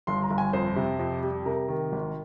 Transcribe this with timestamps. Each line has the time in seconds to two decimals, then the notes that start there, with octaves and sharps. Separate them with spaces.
0.07 G1 C6
0.23 A#5
0.30 G1
0.38 G#5
0.53 F2 C5
0.76 C3
0.99 F2
1.23 G3
1.46 C3 A#4
1.68 D#3
1.92 G#1